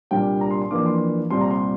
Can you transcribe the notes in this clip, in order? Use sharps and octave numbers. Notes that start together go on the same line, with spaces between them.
C2 A#2 G3 A#3 D4 G5
A#5
C6
C6
F2 E3 A#3 D4 D6
C6
C2 A#2 G3 C4 C6
A#5
C6